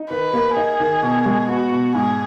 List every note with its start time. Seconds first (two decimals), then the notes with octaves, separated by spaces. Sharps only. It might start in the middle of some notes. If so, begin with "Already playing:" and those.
Already playing: D#4
0.10 D#3 B4
0.33 A#3
0.56 D#4 G#4
0.80 D#3
1.03 B2
1.26 G#3
1.48 B3 F#4
1.72 B2
1.95 G#2 G#4